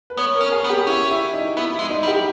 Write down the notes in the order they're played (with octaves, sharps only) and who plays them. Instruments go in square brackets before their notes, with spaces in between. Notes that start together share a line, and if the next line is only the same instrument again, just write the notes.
[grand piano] B4
[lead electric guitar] B3 [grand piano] C#5
[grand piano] A#4
[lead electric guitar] C#4
[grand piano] G#4
[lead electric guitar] B3
[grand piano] G4
[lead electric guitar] C#4 [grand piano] E4
[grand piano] E4
D#4
[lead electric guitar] B3 [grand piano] E4
[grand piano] E4
[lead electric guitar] G#3
[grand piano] D#4
[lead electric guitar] G3
[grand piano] G4